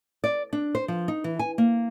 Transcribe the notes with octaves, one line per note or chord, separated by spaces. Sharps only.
D5
D4
C5
F3
D#4
E3
G#5
A#3